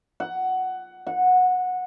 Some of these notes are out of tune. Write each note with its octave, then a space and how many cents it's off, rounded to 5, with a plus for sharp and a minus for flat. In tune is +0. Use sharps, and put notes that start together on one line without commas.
F#5 +10
F#5 -15